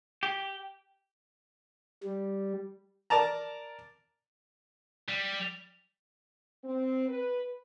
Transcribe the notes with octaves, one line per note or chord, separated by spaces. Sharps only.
G4
G3
A#4 D5 A5 A#5
G3
C4
B4